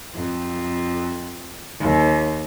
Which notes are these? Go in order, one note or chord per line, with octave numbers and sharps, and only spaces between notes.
F2
D#2